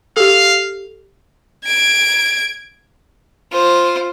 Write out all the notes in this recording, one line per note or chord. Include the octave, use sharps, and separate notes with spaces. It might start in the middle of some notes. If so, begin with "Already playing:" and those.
G4 A4 F5
G#6 D7
F4 C5